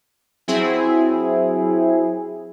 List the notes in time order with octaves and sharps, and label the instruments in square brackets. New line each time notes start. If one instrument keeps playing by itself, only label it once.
[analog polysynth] F#3 C4 E4 G#4